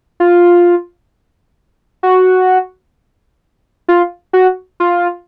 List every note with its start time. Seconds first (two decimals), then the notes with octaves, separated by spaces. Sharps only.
0.20 F4
2.03 F#4
3.88 F4
4.33 F#4
4.80 F4